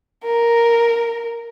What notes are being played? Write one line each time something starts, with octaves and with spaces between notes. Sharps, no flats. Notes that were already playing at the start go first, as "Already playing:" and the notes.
A#4